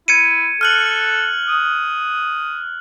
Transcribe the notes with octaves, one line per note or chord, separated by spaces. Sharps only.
E4 G#6 C#7 D#7
A4 F6 F#6 F#7
D#6